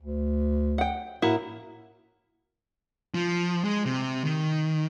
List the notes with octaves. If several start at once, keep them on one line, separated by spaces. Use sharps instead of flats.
D2
F#5 G5
A2 A#3 E4 F#4
F3
G#3
C3
D#3